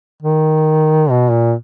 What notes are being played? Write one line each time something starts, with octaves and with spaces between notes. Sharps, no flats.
D#3
B2
A#2